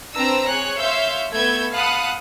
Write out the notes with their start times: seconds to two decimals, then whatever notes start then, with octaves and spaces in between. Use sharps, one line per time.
0.14 C4 D4 B4 A#5 E6
0.46 G#4 C#5 F#6
0.78 C#5 E5 F5 C6 E6 G6
1.31 A3 B3 E6 G6 G#6
1.74 F5 F#5 A5 B5 D#6 F#6